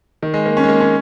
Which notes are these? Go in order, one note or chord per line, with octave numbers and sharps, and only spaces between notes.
D#3
G#3
A#3
C#4
G#3
A#3
C#4